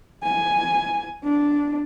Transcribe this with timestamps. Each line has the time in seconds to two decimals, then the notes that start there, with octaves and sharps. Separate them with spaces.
0.24 G#5
1.24 D4